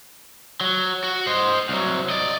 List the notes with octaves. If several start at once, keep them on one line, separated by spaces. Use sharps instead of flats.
F#3
F#4
C5 D#5
C2 F#3
D5 D#5